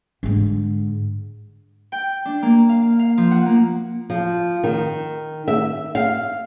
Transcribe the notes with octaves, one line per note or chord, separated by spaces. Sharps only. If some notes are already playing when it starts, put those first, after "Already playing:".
G#2 D3
G5
D4
A#3
F5
F5
F3
F#5
A#3
F3
D#3
E5
F5